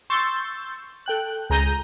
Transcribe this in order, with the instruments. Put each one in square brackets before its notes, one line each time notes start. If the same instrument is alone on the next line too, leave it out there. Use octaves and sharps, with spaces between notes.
[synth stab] C6 C#6 E6 G6 A6
A4 G5 F#6
C#2 G#4 A#5 G6 A#6 D#7